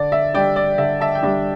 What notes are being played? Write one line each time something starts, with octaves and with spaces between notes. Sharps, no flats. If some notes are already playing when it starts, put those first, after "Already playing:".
Already playing: D3 D5
E5
G3 D4 D5 G5
D5
D3 E5
E5 A5
G5
G3 D4 E5